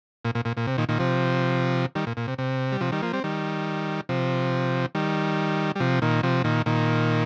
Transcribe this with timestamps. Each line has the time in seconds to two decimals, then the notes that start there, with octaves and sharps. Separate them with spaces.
0.24 A#2
0.35 A#2
0.45 A#2
0.57 A#2
0.67 C3
0.78 A#2 D#3
0.89 A#2 D#3
0.99 C3 F3
1.95 D#3 G3
2.07 A#2
2.17 A#2
2.27 C3
2.38 C3
2.72 G3
2.81 C3 F3
2.92 D#3 G3
3.02 F3 A#3
3.13 G3 C4
3.24 D#3 G3
4.09 C3 F3
4.95 D#3 G3
5.75 G3
5.80 C3 F3
6.02 A#2 D#3
6.23 C3 F3
6.44 A#2 D#3
6.66 A#2 D#3